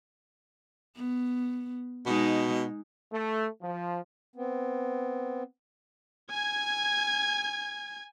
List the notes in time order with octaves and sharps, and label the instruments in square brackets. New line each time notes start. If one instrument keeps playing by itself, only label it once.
[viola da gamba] B3
[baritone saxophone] B2 [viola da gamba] G#3 D#4
[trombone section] A3
F3
[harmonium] B3 C4
[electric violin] G#5 G#6